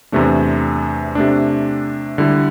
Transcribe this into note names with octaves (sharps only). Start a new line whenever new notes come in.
E2 C3 A3 D4
C3 A3 D4
D3 G3 E4 A4